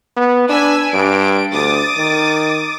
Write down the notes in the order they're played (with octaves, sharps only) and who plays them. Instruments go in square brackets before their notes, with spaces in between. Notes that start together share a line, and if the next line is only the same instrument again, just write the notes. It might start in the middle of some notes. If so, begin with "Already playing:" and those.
[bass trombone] B3
[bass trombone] D4 [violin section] B4 G#5 E6
[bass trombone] G2 [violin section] D7
[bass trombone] D2 [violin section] D6 D#6 A6
[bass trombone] D#3